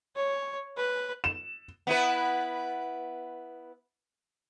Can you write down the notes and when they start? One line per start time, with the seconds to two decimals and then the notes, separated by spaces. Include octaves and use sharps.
0.16 C#5
0.77 B4
1.24 E7
1.87 B3 E4 B4